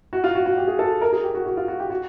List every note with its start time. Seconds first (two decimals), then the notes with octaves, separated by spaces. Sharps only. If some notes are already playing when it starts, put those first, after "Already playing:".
0.13 F#4
0.24 F4
0.35 F#4
0.46 F#4
0.57 G4
0.68 G#4
0.79 A4
1.01 A#4
1.13 G#4
1.24 G4
1.35 F#4
1.46 F#4
1.57 F4
1.68 F#4
1.80 G4
1.90 F#4